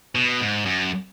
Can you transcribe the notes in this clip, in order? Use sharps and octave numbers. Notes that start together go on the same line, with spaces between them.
B2
G#2
F#2